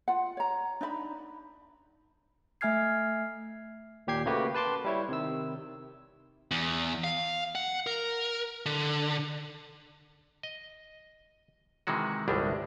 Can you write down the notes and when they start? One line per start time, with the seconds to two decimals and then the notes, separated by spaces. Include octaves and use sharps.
0.08 F4 F#5
0.37 C#5 A#5
0.81 D4 D#4 D#5 B5
2.61 A3 E5 G#5 F6 G#6 C7
4.07 D#2 A#2 G4 G5 G#6 C7
4.26 C#3 A3 A#3 F#4 G4 B4
4.54 B4 A5 C6 D6
4.85 G3 E4 C#5
5.09 C3 D#3 E6
6.51 E2
7.04 F5
7.55 F#5
7.87 A#4
8.66 D3
10.43 D#5
11.87 C3 D#3 E3 G#3 F#4
12.28 G1 C2 A2 G3 G#3 D4